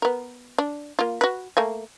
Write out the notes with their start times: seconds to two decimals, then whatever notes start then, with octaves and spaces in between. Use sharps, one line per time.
0.02 B3 A#4
0.58 D4
0.99 A#3 F4
1.21 F#4 B4
1.57 A3 A#3 G#5